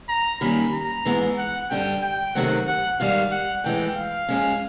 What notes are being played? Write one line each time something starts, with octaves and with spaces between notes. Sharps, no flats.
A#5
F#2 D#3 G3 A#3 C#4 B5
A#5
G#2 E3 G#3 B3
F#5
G2 D3 G3 G5
G5
C3 D#3 F#3 A3 C4 F#5
F#5
G#2 D#3 G3 F5
F#5
A2 E3 G#3 G5
F5
G#2 F3 G#3 C#4